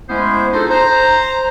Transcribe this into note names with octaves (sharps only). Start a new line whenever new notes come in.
G#3 A3 B3 C#4 E4 C5
D4 D#4 F4 G#4 A4 C5
C5 A#5